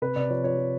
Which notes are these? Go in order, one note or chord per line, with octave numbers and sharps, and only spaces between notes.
C3 B4
C3 D5
F3 C#5
F3 C#5
F3